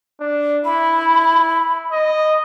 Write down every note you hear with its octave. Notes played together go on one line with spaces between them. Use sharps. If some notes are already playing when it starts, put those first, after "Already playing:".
D4
E4 B5
D#5